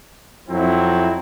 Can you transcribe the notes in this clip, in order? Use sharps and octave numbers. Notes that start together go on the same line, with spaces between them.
F2 F#3 C4 E4